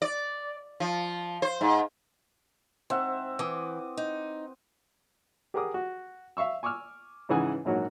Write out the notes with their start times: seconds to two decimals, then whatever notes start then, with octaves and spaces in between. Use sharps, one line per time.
0.02 D5
0.80 F3
1.42 C5
1.61 G#2
2.90 G#2 C4 E5 F#5
3.39 E3 D6 D#6
3.97 D#4
5.54 G4 G#4 A#4 F#5 D6 D#6
5.74 F#4
6.37 E5 F5 C#6 E6
6.63 G#5 C#6 D6 E6 F6
7.29 G#2 C#3 E3 F#5 G#5 D#6
7.65 A#1 G#2 F#3 A#3 F#4 C#5